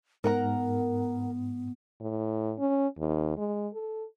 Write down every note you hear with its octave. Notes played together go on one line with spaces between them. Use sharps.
G#2 B3 A#4 F#5 A#5
A2
C#4
D#2
G#3
A4